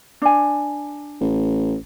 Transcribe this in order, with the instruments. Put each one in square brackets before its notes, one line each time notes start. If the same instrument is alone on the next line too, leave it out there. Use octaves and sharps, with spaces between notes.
[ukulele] D4 G#5
[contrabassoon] A1